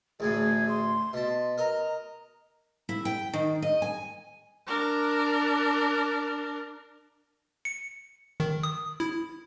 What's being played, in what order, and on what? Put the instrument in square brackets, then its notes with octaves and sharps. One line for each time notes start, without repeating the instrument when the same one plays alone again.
[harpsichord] A1 D2 A2 [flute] G#4
[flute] C6
[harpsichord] B2 A5
[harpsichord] A#4 D#5 [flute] A#5
[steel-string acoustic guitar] E4
G5
D#3
D#5
G#5
[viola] D4 A#4
[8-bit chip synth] C#7
D#3
D#6
E4